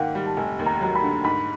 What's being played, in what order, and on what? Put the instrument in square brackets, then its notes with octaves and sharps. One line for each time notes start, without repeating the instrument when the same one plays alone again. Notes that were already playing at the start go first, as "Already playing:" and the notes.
Already playing: [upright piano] G#2 D#3 A#3 [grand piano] F#5 G5
[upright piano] G3
[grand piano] A5
[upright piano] F1 [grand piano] G#5
[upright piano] D#2
[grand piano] A#5
[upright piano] F#3 [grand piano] A#5
[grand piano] B5
[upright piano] D3
[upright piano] G#2 [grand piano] B5